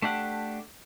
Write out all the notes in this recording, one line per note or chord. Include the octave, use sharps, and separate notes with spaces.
A3 D4 G4 F#5